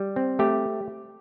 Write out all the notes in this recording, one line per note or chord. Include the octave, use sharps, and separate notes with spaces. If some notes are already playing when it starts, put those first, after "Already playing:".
Already playing: G3
C4
A3 G4